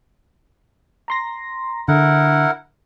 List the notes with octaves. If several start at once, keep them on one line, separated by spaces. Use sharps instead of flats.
A#5 C6 A#6
D3 E4 A#4 F#5